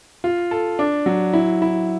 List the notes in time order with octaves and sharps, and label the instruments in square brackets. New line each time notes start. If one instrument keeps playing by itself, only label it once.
[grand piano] F4
A4
D4
F#3
E4
E4